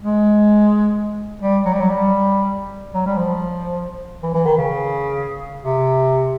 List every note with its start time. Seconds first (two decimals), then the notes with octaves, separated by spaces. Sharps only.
0.02 G#3
1.42 G3
1.66 F#3
1.73 G3
1.80 F#3
1.90 G3
2.95 F#3
3.06 G3
3.17 F3
4.23 E3
4.35 E3
4.46 D#3
4.58 C#3
5.62 C3